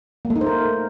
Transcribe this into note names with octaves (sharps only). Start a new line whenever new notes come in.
A#3
A3
D#4
C5
A#4